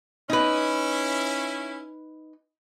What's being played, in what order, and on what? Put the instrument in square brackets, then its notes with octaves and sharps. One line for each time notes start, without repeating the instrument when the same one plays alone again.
[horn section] C#4 E4 [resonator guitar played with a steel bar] D#4 B4